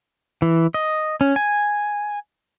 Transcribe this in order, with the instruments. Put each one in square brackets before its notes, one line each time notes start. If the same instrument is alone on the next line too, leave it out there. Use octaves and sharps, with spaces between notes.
[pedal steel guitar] E3
D#5
C#4
G#5